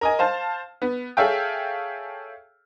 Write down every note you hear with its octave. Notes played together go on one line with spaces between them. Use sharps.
A#4 D#5 G#5
C5 F5 A5
B3
G#4 A4 C#5 E5 F5 G5